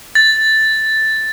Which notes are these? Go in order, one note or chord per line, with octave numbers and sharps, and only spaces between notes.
A6